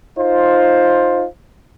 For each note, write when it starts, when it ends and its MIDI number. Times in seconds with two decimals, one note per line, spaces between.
0.17 1.26 63
0.17 1.26 65
0.17 1.26 72